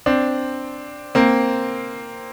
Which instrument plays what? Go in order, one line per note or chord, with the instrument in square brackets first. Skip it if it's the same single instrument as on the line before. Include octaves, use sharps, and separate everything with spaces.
[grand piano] C4 D4
A#3 C4